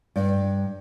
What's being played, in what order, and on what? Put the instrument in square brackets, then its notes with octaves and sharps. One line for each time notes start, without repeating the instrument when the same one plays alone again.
[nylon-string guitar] G2